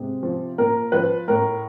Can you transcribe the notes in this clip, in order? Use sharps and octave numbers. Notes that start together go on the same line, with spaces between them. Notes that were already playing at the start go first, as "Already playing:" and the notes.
Already playing: C3 G#3
F3
A#2 A#4
F3 B4
A2 A#4